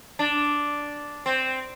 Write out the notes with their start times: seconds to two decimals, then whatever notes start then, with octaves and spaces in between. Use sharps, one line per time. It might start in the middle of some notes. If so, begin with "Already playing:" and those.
0.19 D4
1.26 C4